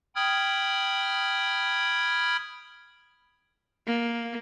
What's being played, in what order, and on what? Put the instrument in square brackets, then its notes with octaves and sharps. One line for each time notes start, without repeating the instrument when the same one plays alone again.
[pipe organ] G5 B5 D#6 F6 G#6
[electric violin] A#3